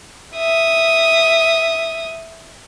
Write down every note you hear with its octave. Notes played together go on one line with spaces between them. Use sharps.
E5 D#6